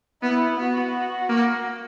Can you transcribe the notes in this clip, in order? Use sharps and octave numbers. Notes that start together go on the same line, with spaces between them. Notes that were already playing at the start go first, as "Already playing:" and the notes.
B3 E4
B3 F#4
A#3